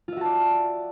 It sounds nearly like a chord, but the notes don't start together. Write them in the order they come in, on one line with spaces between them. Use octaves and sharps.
F4 E5 F#4 A5 D5